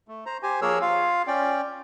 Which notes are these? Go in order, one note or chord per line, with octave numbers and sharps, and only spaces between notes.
A3
C5 A#5
G4 C5 G#5
F3 A#3 G#4 A#4 C#5 E6
F4 F5
C#4 D5 G5